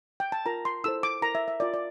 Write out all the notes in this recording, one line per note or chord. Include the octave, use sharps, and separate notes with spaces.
G5
A5
F4 A#4 A#5
C6
E4 A4 C5 E6
D6
E4 A#4 A#5
E5
E5
F4 A#4 D5
D5